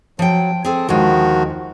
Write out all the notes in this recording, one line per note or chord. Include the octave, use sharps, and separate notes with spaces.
F3 F#3 G5
C4 G#4 A4
D#2 D3 D#3 F3 G#3 F#4